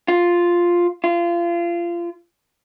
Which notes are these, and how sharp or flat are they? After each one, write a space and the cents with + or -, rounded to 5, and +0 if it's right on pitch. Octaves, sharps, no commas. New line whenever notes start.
F4 +0
F4 -25